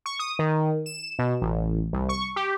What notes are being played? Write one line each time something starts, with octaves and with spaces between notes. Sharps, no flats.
C#6
D#6
D#3
E7
B2
A1
C2
C#6
G4